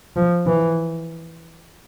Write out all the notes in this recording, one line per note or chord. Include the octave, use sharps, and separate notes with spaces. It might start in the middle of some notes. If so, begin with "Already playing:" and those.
F3
E3